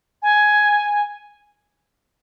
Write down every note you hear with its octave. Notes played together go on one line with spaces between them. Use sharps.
G#5